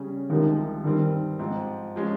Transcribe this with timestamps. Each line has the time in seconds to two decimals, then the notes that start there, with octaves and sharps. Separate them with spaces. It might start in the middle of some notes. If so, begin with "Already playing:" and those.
Already playing: C#3 G3 C#4 G#4
0.30 C2 C3 D#3 F3 G#3 D#4
0.84 G2 D#3 G3 C4
1.39 G#2 F3 C4
1.96 F3 G#3 C#4